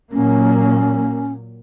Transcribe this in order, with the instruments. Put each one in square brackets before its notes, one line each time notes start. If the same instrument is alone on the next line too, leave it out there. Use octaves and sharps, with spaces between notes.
[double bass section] A#2 F#3 A#3 [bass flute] C#4